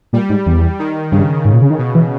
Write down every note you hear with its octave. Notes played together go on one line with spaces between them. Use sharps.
A#2 G3
G#2
E2
D#3
G2 C#3
G#2
A#2
C#3
D#3
B2
E3